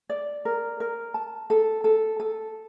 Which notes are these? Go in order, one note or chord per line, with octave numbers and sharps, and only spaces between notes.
D5
A#4
A#4
A5
A4
A4
A4